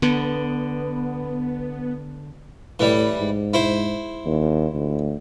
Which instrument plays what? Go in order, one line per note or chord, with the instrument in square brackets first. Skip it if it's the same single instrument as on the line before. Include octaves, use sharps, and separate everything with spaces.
[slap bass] D3 [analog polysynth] B3
[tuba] A2 [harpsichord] E3 G3
[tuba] G#2
[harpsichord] E4 C5
[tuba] D#2
D2